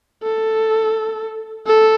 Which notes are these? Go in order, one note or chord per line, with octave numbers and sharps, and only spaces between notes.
A4
A4